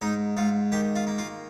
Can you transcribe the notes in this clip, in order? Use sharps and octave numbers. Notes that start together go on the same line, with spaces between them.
G#2 D#4
G#2 F4
D#3 G4
F4
A#3
F4